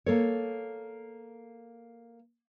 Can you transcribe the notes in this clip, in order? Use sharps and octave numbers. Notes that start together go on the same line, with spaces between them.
A#3 A4 C#5